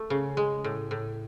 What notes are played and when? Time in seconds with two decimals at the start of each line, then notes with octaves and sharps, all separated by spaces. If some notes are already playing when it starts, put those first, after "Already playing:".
Already playing: A3
0.10 C#3
0.37 G#3
0.64 A2
0.91 A2